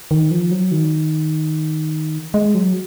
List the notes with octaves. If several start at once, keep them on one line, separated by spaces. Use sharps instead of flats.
D#3
F3
F#3
D#3
G#3
F#3